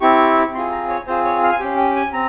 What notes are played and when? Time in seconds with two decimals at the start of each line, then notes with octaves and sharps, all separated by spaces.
0.01 C4 E4 G4 C#6
0.54 C4 F4 G#4 C6
0.71 A#5
0.89 C#5
1.07 C4 F4 G#4 C5
1.25 C#5
1.43 F5
1.52 G#5
1.60 C#4 G4 G5
1.78 G5
1.96 G#5
2.13 C4 A#5